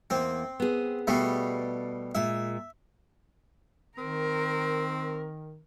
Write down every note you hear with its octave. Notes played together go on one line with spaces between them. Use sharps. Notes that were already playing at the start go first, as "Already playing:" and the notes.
E2 A#3 C4
B3 G#4
B2 G3 A3
A#2 G#3 E5
D#3 C4 A#4